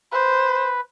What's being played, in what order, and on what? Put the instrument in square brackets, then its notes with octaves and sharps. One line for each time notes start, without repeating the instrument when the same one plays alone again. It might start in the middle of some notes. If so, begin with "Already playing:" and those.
[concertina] B4 [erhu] C5